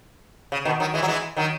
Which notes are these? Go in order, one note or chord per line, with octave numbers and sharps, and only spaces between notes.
C#3
B2 D#3
D#3 F#3
E3 G#3
F#3
E3 G#3
D#3 F#3